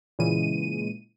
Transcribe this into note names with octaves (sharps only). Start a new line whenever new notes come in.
A#2 C#3 E3 G#3 D#7